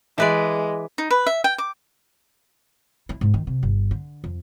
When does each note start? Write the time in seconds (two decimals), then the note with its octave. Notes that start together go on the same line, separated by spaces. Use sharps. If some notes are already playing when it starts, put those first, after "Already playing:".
0.18 E3 G#3 B4 D5
0.98 D#4
1.11 B4
1.27 E5
1.44 G5
1.58 D6
3.09 E4
3.21 G#2
3.34 D#3
3.47 C3
3.63 G1
3.91 D3
4.24 F2